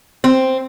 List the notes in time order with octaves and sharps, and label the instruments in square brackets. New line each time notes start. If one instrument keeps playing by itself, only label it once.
[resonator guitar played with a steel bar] C4